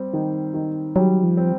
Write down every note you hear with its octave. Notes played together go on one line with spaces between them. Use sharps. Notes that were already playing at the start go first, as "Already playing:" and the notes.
Already playing: G3 C4
D#3
D#3
F#3 G3
F3
C4